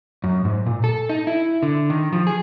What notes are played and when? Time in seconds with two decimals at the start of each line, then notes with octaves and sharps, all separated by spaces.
0.24 F#2
0.45 G#2
0.66 A#2
0.84 A4
1.09 D#4
1.27 E4
1.63 D3
1.90 D#3
2.12 F3
2.27 G#4